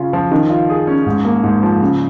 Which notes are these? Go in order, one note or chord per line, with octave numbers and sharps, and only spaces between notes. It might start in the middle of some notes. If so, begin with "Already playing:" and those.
Already playing: C#3 C#4 F4
F3
D#3
F4
G#4
C#4
G#2
A#3
G#2
F3
C#3